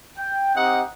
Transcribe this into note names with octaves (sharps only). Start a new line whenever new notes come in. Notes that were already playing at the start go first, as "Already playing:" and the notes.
G5
C4 D#4 G4 D#5 F#5